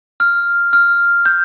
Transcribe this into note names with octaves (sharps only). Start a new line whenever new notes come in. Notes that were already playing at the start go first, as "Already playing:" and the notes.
F6
F6
G6